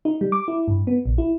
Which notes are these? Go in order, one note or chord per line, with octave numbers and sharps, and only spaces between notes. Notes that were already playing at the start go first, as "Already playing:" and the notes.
D#4
G3
D6
E4
G2
B3
A#1
E4